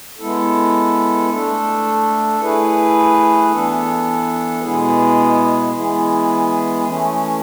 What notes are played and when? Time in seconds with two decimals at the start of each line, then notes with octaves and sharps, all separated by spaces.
0.18 G#3 B3 E4 A4
1.29 A3 D4 A4
2.40 A3 E4 G#4 B4
3.51 E3 B3 D4 A4
4.62 B2 G#3 B3 E4 G#4
5.74 E3 G#3 B3 E4 G#4
6.84 E3 A3 C#4